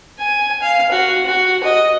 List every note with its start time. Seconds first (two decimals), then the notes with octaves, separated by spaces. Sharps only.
0.19 G#5
0.62 F5
0.91 F#4
1.26 F#4
1.63 D#5